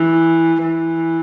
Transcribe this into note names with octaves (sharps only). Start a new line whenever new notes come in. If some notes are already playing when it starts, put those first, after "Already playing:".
Already playing: E3
E3